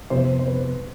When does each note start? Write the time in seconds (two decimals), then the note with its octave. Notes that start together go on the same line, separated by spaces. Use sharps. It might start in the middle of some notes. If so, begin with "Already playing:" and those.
0.10 F2 C3 F3 B3 C5
0.39 C5
0.48 B4